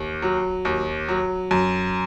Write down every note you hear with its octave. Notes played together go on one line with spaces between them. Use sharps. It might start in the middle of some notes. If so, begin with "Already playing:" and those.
Already playing: D#2
F#3
D#2
F#3
F#2